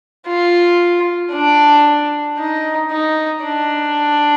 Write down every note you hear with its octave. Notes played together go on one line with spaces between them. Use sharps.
F4
D4
D#4
D#4
D4